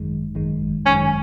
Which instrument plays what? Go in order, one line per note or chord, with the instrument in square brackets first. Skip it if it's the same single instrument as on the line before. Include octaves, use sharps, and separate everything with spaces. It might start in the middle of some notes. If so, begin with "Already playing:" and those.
Already playing: [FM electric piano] G#1 F#2 D#3 G#3
G#1 F#2 D#3 G#3
[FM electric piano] G#1 F#2 D#3 G#3 [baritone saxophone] C#4